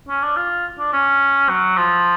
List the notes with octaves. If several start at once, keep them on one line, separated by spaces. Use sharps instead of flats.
C#4
D4
F4
D4
C#4
F#3
F3